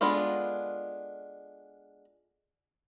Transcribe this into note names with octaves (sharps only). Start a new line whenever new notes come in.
G#3 B3 D4 F4 A4